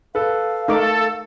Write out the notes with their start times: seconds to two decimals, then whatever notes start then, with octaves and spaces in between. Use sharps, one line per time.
0.15 A4 B4 F5
0.68 A3 D#4 A4 A#4 D6